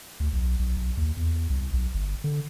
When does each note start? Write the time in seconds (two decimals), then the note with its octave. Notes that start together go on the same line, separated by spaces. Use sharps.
0.20 D2
0.33 B1
0.59 B1
0.77 B1
0.98 D#2
1.17 E2
1.50 C2
1.74 B1
1.95 G1
2.24 D3